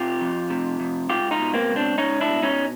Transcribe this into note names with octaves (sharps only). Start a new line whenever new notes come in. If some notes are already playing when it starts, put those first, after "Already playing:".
Already playing: C3 F4 G4
F2
C3
F2
C#2 F4 G4
D#4 F4
B2
A#3 C4
C#2
C4 D4
C#2 C#4 D#4
D4 E4
B2
C#4 D#4